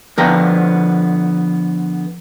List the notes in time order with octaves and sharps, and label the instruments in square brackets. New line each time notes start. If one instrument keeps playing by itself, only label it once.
[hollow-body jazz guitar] D3 F3 B3 G5 A#5